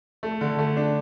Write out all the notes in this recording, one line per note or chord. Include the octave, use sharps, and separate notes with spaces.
A3
D3
A3
D4